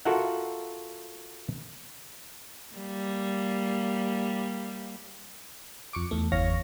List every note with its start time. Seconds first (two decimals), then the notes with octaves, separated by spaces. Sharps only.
0.05 F4 F#4 A4 A#4 E5 F#5
2.75 G3 A#3
5.93 F2 C#6 D6
6.11 E2 A3
6.32 G1 E2 C#5 F5 A#6